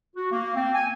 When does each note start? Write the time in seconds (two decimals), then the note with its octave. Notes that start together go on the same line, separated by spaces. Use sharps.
0.16 F#4
0.31 A#3
0.56 C4
0.75 G#5